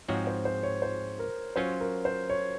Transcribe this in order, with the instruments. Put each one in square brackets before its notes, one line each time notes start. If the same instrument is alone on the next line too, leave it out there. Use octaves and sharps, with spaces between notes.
[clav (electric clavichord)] G#2 F3 G#3 C4 F#4 [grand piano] C#5
[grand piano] C5
C5
C#5
C5
A#4
[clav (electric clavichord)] F#3 C#4 F4 [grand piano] C5
[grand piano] A#4
C5
C#5